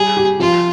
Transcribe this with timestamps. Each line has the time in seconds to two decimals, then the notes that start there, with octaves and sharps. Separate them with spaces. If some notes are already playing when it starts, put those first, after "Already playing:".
Already playing: G3 G#4
0.17 G4
0.39 F3 F4